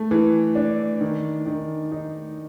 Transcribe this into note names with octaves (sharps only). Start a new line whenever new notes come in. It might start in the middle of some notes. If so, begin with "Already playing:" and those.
Already playing: A3
E3
D4
D#3
D#3
D#4